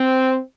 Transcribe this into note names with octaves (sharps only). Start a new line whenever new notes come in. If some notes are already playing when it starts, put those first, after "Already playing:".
Already playing: C4